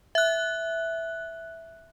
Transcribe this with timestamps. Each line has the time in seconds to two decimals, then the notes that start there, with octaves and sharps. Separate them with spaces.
0.15 E5 F#6